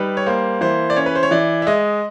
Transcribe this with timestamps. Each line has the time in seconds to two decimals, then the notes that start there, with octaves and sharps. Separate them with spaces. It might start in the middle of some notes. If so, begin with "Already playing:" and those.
Already playing: G3 D#4 B4
0.17 C#5
0.26 A#3 C5
0.61 E3 C5
0.90 D5
0.96 C#4 C#5
1.06 B4
1.15 C5
1.23 C#5
1.31 E3 D5
1.62 E5
1.67 G#3 D#5